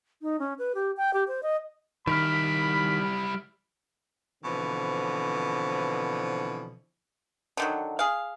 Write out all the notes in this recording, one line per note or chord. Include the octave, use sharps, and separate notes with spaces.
D#4
C#4
B4
G4
G5
G4
C5
D#5
D#3 G3 E4 B5 F6 B6 D7
B2 D3 E3 F3 C4
D3 D#3 F#3
G#4 F5